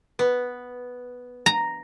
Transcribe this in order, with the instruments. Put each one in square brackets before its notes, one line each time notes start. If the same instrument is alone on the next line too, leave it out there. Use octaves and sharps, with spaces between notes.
[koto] B3
[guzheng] A#5